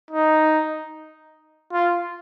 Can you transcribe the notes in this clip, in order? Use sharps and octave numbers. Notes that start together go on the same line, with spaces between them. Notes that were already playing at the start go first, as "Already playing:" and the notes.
D#4
F4